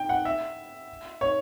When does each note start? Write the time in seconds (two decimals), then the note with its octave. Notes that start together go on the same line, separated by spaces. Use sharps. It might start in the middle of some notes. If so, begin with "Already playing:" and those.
Already playing: G5
0.09 F#5
0.25 E5
1.21 C#5